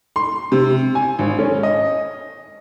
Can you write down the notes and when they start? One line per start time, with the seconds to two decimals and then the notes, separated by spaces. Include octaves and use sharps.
0.16 C6
0.52 C3
0.95 G#5
1.19 G#1
1.39 C#4
1.63 D#5